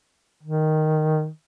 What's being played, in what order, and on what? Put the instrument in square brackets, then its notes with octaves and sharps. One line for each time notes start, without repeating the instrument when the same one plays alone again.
[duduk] D#3